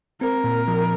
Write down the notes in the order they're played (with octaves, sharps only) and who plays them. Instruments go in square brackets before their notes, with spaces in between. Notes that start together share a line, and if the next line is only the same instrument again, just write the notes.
[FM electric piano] C4 [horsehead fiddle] A#4
[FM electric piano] A#2
F3